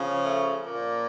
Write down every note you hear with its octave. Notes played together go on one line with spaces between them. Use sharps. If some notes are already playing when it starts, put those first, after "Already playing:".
Already playing: C#3 F3
A3
A#2 F3 A#3